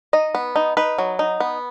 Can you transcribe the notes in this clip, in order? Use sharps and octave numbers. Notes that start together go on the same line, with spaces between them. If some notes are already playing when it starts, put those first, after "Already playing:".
D#4 D#5
B3
D#4
D#4 B4
F#3
D#4
B3